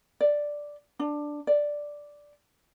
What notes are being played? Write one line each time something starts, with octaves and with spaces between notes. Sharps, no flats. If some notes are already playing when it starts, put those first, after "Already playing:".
D5
D4
D5